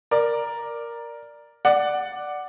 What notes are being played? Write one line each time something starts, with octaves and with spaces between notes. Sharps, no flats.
A#4 D5
D5 F#5